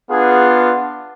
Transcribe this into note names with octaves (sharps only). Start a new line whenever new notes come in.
B3 D4 F4 G#4